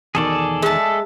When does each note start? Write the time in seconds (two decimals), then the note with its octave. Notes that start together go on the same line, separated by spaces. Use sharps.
0.15 E2 B2 D#3 G#4 A4 D5
0.62 G#3 E5 A5